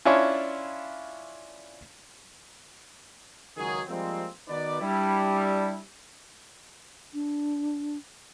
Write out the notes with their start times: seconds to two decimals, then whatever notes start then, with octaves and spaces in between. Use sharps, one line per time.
0.05 C#4 D4 E4 F4 C#5
3.57 C#2 D#3 F#3 G#4
3.88 F3 G3 G#3 A#3 C4
4.48 D#3 B3 D#4 F#4 B4 D5
4.81 G3 D4 E4
7.14 D4